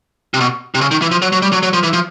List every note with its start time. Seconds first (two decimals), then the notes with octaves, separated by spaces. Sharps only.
0.34 C3
0.40 B2
0.75 C3
0.81 C#3
0.91 D#3
1.02 E3
1.11 F3
1.22 F#3
1.32 F#3
1.42 G3
1.53 F#3
1.63 F#3
1.73 F3
1.83 E3
1.93 F3